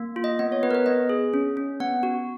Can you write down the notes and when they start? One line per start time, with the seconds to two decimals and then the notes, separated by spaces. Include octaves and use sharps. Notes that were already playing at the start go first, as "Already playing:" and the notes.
Already playing: A#3
0.16 F4
0.24 D#5
0.39 B3 D#5
0.52 C#5
0.63 B3 B4
0.71 A#4
0.75 B4
0.86 B3 D#5
1.09 G#4
1.34 C#4
1.57 C#4
1.80 B3 F#5
2.03 F#4